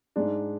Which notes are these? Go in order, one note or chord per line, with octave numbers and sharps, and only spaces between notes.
G#2 G#3 D4